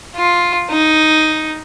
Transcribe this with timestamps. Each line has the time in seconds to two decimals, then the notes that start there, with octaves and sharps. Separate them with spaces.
0.16 F4
0.70 D#4